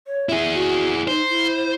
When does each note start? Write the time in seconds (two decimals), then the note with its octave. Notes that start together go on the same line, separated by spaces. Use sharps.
0.07 C#5
0.29 E4 G#4 E5
0.55 F#4
1.08 D#4 C5
1.30 E4